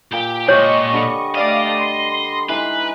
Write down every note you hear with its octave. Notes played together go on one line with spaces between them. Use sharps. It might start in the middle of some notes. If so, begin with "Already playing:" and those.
A#2 G4 G5
A#2 G#3 G4 C#5 D#5 C#6
D3 G3
A3 D5 D#5 F5
C6
E3 G#3 D#4 B4